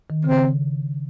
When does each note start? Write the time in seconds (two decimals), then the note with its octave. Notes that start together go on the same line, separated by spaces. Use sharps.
0.10 D#3
0.24 C#3 C4